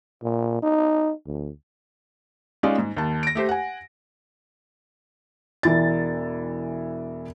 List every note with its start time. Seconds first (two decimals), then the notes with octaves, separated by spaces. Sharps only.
0.23 A#2
0.62 D#4
1.26 D2
2.63 G#3 C#4 D#4 F4 D5
2.78 G#2
2.97 D#2 A5
3.23 A#6 D7
3.35 A3 G4 C5
3.49 F#5 G#5
5.63 E1 E3 A6